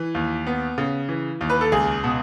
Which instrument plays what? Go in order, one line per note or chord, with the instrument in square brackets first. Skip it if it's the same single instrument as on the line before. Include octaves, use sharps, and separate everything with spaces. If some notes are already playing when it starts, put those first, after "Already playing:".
Already playing: [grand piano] E3
D#2
B3
C#3
E3
D#2
B4
A4
C#2 G#4
B2